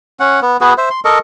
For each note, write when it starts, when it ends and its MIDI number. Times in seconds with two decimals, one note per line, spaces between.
0.20 0.40 61
0.20 0.40 78
0.42 0.57 59
0.61 0.74 59
0.61 0.74 66
0.61 0.74 68
0.61 0.74 71
0.78 0.89 72
0.78 0.89 76
0.90 1.00 84
1.05 1.19 69
1.05 1.19 70
1.05 1.19 75
1.05 1.19 85